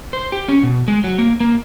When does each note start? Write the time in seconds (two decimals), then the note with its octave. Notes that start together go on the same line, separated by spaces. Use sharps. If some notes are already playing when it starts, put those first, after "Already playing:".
0.13 C5
0.32 G4
0.49 C#4
0.63 B2
0.88 G#3
1.04 F#3
1.18 A#3
1.40 A#3